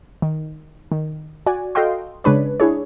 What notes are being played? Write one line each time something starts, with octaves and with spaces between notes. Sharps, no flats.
D#3
D#3
F#4 D5 G#5
F#4 A4 D#5 F5 G5 C6
C#3 G#3 D4 B4 C#5
D4 E4 G#4 C#5